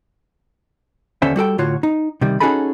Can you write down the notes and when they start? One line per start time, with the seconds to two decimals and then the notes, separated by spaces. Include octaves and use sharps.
1.22 D#2 D3 C#4 D4 C5 E5
1.36 G3 F#4 A4 G5
1.58 A2 D3 F4 F#4 C#5
1.83 D#4
2.21 C3 D#3 G3
2.40 C#4 D#4 F#4 G#4 A4 B5